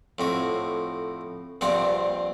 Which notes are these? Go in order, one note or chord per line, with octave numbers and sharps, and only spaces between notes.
F2 A2 F#4
A#1 G2 C4 F#5 D6